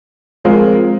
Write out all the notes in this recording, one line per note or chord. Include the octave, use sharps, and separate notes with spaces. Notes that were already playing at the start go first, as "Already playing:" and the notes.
F3 G#3 C4 F4 A#4